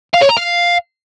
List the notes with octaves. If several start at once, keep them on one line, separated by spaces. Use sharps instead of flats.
F5
C#5
A#5
F5